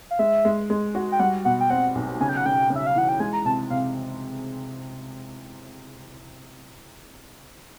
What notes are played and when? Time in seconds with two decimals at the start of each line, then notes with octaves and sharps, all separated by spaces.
0.11 F5
0.19 G#3 E5
0.45 G#3
0.70 G#3
0.95 F#4
1.12 G5
1.20 G3 F#5
1.45 B2 F#5
1.60 G5
1.70 C4 F#5
1.95 B1
2.20 C#3 G#5
2.29 G5
2.37 F#5
2.45 C#3 G5
2.70 C#3
2.75 E5
2.87 F5
2.96 E3 F#5
3.09 G5
3.20 G#3 G#5
3.33 A#5
3.45 C3 A5
3.70 C3 F5